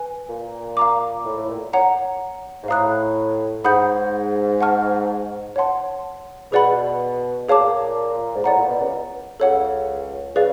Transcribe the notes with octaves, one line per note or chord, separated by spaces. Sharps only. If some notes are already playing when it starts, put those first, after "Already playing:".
Already playing: B4 G#5
A#2
F5 A#5 D6
A2
A2
A#2
C#5 F#5 A#5
G#2
A2 F5 A#5 D#6 F#6
G#2 F#5 B5 D#6 G6
F#5 A5 C#6 F6
C#5 F#5 A5 C6
B2 G#4 B4 D5 F#5 B5
A#2 G#4 C#5 F5 A5 D6
G#2
A2 D5 F#5 A#5
A#2
B2
C#2 C#3
C#2 C#3 A4 C#5 F#5
C#3 G#4 B4 D5 F5